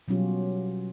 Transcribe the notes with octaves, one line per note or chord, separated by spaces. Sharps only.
B2 F#3 G3 C#4 F4 G4